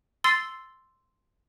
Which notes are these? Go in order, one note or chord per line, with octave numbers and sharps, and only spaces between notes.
C6 E6 A6 C7